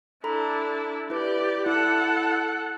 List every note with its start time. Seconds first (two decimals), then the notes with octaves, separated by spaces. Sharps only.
0.24 D4 E4 A4 A#5 B5
1.10 E4 G4 B4 D5
1.66 E4 A4 F#5